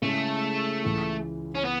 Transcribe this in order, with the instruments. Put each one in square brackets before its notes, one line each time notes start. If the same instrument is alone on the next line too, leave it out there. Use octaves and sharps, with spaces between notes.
[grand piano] C#3 G#3 C#4 E4 [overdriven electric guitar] A3
[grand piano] C#2 C#3 E3
[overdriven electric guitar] C#4
B3